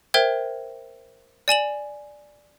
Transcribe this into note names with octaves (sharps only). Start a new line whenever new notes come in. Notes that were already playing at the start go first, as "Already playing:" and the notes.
A#4 C5 E5 G5 G#6
D5 G#5 E7 F#7